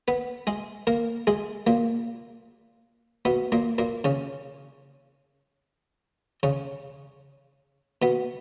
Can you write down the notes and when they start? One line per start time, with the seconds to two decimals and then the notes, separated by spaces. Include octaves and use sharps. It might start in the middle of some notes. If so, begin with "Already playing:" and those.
0.08 B3 B4
0.47 G#3 G#4
0.87 A#3 A#4
1.27 G#3 G#4
1.67 A#2 A#3
3.25 B2 B3
3.52 A#2 A#3
3.78 A#2 A#3
4.04 C#3 C#4
6.43 C#3 C#4
8.02 B2 B3